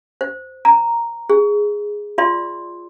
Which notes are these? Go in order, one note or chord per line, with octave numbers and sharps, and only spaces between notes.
C5
A#5
G#4
F4 D5 E5 C6